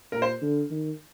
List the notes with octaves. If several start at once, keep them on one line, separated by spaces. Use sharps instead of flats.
A#2 A#4
C5
D3
D#3